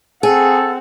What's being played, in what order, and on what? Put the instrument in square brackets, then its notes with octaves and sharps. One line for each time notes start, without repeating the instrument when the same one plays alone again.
[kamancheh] C4 F#5 [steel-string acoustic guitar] G#4 [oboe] A4